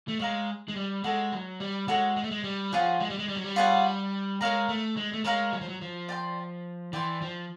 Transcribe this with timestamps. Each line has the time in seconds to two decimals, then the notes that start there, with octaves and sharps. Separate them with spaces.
0.08 A3
0.19 G#3 C#5 F5 A#5
0.68 G#3
0.76 G3
1.04 G#3 F#4 A4 C#5
1.32 F#3
1.60 G3
1.88 G#3 F#4 A4 C#5
2.16 G#3
2.24 A3
2.31 G#3
2.44 G3
2.72 F3 F4 G#4 C#5 F#5
3.00 G#3
3.10 G3
3.19 G#3
3.28 G3
3.36 F#3
3.44 G3
3.56 F4 G#4 C#5 F#5
4.41 G#3 A#4 C#5 F5 A#5
4.69 A3
4.97 G#3
5.13 A3
5.24 G#3 A#4 C#5 F5 A#5
5.53 F#3
5.61 F3
5.69 F#3
5.81 F3
6.09 D5 G5 C6
6.93 E3 D5 G5 C6
7.22 F3